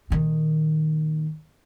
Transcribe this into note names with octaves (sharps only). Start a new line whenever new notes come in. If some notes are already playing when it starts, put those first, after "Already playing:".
A#2 D#3